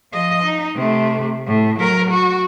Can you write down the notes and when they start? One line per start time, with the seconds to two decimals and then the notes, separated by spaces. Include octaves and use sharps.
0.12 F3 D#5
0.43 D#4
0.75 C3 A3
1.46 A2
1.79 F#3 A#4
2.11 F#4